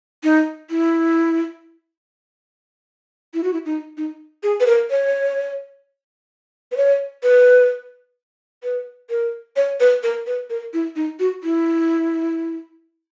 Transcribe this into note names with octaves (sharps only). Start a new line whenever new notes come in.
D#4
E4
E4
F#4
E4
D#4
D#4
G#4
B4
A#4
C#5
B4
C#5
B4
B4
A#4
C#5
B4
A#4
B4
A#4
E4
D#4
F#4
E4